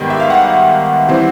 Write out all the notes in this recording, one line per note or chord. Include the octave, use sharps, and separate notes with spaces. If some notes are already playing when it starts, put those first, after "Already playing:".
Already playing: G#2 D#3 G3 B3 G5
E5
F5
F#5
E3 G3 C4